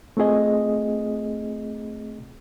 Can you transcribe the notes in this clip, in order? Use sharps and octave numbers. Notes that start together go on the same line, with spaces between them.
A3 C4 F4 G#4 D#5